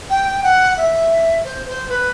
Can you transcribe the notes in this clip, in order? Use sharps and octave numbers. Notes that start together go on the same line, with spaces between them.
G5
F#5
E5
C5
C5
B4